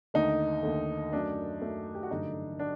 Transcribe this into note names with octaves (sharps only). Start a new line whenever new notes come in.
D#2 D3 A3 D#4
D#2 D3 A3
F#2 F#3 A3 D4
F#2 F#3 A3
G4
F#4
A1 G2 D3 F#3 A3 D#4
D4 F#4